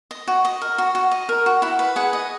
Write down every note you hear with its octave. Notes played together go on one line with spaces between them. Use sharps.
D#5
F#4
D#5
A#4
F#4
F#4
D#5
A#4
F#4
E4 F#5
B4
G#4 F#5
D#5